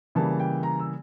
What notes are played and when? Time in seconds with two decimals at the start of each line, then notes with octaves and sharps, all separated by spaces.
0.15 C#3 E3 G3 A#3 A5
0.40 G5
0.63 A#5
0.80 E6